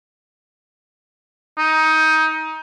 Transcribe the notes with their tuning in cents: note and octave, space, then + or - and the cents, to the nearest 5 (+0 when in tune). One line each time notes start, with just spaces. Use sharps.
D#4 +20